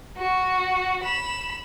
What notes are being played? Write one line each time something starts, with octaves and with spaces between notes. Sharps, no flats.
F#4
B5 E7